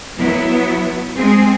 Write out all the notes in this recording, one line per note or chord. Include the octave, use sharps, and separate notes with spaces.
F#3 B3 E4
G#3 C4 G#4